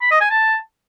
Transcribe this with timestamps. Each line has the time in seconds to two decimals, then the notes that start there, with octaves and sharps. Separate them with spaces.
0.01 B5
0.11 D#5
0.21 G#5
0.31 A5